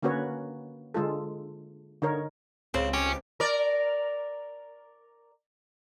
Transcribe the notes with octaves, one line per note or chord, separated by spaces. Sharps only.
D3 A#3 C#4 F#4 B4 C#5
D3 G#3 F4 A4
D3 D#4 A#4 C#5
C#2 C#3 C4
C#4 G4
A#4 D5